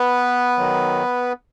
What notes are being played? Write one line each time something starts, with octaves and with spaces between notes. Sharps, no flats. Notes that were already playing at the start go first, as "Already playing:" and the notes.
Already playing: B3 B4
D#3 F#3